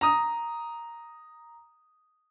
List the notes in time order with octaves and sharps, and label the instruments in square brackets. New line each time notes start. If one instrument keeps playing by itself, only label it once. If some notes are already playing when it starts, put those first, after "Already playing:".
[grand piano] A#5 D#6